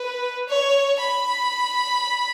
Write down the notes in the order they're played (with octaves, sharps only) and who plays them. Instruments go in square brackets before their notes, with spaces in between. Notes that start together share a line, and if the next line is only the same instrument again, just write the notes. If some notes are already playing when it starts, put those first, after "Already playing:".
Already playing: [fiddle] B4
C#5
B5